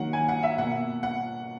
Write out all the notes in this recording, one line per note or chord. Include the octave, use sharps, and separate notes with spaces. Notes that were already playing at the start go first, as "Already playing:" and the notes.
Already playing: D#3 F#3 A#3 F#5
G#5
F#5
E5
B2 A#3 F#5
F#5